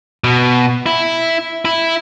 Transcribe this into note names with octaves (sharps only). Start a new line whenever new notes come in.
B2
E4
E4